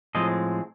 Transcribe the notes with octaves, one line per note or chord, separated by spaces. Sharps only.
A2 F3 G#3 C4 D#5